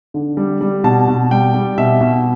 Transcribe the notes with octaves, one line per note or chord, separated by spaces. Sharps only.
D3
G3
G3
B2 A5
B2
G3 G5
G3
B2 E5
B2